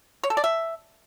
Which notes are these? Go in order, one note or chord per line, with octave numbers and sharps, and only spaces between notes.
C#5
A4
D5
E5